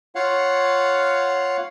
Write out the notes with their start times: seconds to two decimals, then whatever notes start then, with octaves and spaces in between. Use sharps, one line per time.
0.15 F4 C#5 F5 F#5